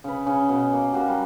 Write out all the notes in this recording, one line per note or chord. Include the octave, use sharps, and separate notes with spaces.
C#3 B4
C#3 C#4
B2
A#3
A#3 F#4 G4
G3